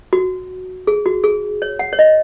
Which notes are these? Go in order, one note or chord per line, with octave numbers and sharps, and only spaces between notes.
F#4
G#4
F#4
G#4
C#5
F#5
C#5
D#5